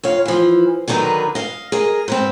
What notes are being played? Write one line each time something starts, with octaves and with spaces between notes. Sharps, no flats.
F2 C#5 F5
E3 F3
D3 D#3 F#3 D#4 A#4 B4
D#5 F5
G#4 A#4 D#5
G#2 B3 C4